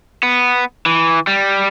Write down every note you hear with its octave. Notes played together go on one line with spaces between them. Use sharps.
B3
E3
G3